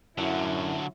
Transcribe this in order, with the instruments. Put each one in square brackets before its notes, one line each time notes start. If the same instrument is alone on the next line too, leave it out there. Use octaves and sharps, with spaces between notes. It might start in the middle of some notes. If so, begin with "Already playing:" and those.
[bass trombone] F#2 [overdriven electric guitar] D3 F#3 [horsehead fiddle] E4